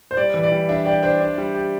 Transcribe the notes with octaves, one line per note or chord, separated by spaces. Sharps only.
C5
G3 D5
E3
D5
G3
D4 E5
G4 D5
D4 C5
D4
G3
G4